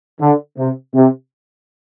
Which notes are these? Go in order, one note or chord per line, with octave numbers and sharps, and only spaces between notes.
D3
C3
C3